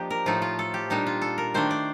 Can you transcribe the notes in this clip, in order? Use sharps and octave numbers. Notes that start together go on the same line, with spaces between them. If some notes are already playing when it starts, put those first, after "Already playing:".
Already playing: F3 A#3 D4 G4 D#5
A#4
A2 F3 A3 D#4 F4
F4
A4
G4
A#2 G3 D4 D#4
F4
A4
A#4
D#3 A3 D4 C5
D5